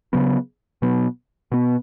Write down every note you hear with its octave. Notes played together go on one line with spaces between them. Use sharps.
C#3 F#3 B3
B2 F#3 B3
B2 B3